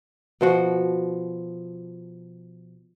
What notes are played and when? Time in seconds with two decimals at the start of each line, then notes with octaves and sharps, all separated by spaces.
0.41 B2 F3 F#4